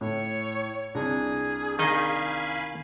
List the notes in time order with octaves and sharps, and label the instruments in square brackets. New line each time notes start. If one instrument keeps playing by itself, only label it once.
[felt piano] A2 [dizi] C#5
[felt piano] C2 D4 [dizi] G#4
[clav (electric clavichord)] D#3 D#4 D#5 [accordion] F5 G#5 B5